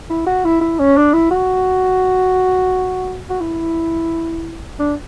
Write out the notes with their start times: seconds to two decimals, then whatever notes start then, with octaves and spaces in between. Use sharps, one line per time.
0.10 E4
0.26 F#4
0.45 E4
0.61 E4
0.79 C#4
0.97 D4
1.14 E4
1.31 F#4
3.30 F#4
3.41 E4
4.80 D4